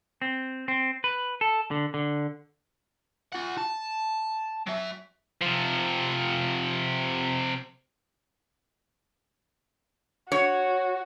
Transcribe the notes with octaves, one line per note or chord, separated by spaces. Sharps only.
C4
C4
B4
A4
D3
D3
F4 F#5
A5
F#3 E5
C3 F3
F#4 C#5